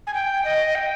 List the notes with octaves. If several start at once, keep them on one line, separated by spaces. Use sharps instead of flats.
G#5
G5
D#5
G5